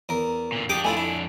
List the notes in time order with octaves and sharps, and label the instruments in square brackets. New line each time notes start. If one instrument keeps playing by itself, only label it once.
[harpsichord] E2 A#4
[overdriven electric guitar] A#2 D3
[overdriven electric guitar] F2 D4 [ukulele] G4 [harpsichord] G5 D6 D#6
[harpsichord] A3 E4 F4 [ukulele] D5 G#5
[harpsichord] E4